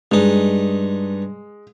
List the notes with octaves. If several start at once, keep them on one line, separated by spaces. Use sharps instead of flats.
G2 G#3 D#4